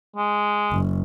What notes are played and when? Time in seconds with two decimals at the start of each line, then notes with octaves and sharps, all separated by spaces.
0.16 G#3
0.71 F#1